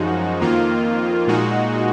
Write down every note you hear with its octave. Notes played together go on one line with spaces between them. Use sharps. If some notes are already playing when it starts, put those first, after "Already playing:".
Already playing: F#2 F3 G#3 D#4 F#4
F2 D#3 A#3 F4
A#2 G#3 D#4 F#4